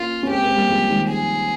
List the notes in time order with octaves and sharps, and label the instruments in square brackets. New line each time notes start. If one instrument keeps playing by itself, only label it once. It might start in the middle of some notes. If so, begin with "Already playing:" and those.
Already playing: [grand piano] A#3 C#4 [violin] F4
[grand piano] C#4
[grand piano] G#3 C4 [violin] G4
[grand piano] G#3 C4
G3 A#3
F3 G#3
D#3 G3
[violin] G#4